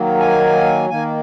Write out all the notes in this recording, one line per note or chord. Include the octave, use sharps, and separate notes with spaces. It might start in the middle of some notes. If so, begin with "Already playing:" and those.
Already playing: D#3 F#3 A#3
G#5
D#3 A#3 G#5